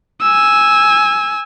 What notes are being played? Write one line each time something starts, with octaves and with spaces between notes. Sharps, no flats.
G#5 E6